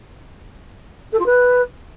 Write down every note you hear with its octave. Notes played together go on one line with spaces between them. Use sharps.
A4
F4
B4